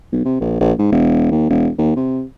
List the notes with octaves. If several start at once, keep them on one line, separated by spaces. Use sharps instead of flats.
B1
C3
A#1
A#1
G#2
E1
D#2
E1
D#2
C3